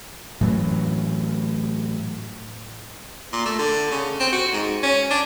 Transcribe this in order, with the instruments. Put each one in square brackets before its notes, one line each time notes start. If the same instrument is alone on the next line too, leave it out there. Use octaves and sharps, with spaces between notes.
[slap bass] A2 E3 F#3
[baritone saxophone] A#2
A3
D3
C#3
C4
F#4
G#2
C#4
D4